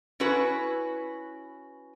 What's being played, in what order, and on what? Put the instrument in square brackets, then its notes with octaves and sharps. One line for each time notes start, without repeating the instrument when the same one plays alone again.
[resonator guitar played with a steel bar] C#4 E4 F#4 B4